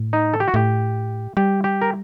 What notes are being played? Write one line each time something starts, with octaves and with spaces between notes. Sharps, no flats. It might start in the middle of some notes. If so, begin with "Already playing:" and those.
Already playing: A2
D#4
A4
G4
F#4
A2 G4
G3 G4
G4
A#4